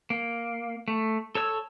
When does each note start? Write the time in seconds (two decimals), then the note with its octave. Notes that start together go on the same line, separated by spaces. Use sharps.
0.10 A#3
0.88 A3
1.35 A4 C#5 E6